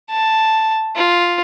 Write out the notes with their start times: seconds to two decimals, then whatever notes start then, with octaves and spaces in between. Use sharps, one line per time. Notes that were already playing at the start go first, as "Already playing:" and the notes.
0.10 A5
0.96 F4